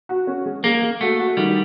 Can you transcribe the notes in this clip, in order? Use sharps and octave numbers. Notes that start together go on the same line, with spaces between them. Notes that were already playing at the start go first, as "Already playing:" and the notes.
F#4
C#4
G#3
G#3 A#3
G#3
A3 F#4
F#4
D#3 G3